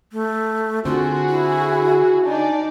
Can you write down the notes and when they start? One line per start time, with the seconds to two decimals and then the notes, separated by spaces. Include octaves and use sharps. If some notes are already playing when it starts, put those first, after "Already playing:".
0.12 A3
0.85 D3 C4 F4 F#4 G#4
1.29 E4
2.25 D4 D#4 D5 G#5